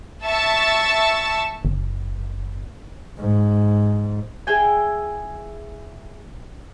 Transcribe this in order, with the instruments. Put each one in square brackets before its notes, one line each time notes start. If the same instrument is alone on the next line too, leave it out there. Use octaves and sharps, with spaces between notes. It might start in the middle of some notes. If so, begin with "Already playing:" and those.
[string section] E5 A5 C#6 E6 A6
[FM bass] F#1
[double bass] G#2
[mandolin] E4 G#4 G5 G#5